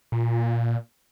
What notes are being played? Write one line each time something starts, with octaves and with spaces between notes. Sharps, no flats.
A#2